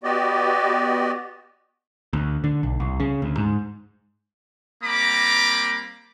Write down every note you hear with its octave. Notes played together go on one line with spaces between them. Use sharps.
B3 F#4 G4 D5 D#5
D2
D3
B1
C2
C#3
D2
G#2
G3 A#3 C4 A#5 B5 D6